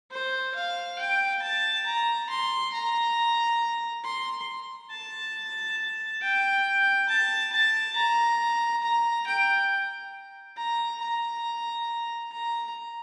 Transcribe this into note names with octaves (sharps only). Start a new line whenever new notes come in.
C5
F5
G5
A5
A#5
C6
A#5
C6
A5
G5
A5
A5
A#5
A#5
G5
A#5
A#5
A#5